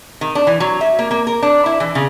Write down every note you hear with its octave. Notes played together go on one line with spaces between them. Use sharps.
D#3
D4
E3
F#3
E5
A#3
A#3
A#4
D4
E4
E3
C#3